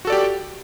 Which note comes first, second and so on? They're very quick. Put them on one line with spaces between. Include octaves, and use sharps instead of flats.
F#4 A4 D5 G4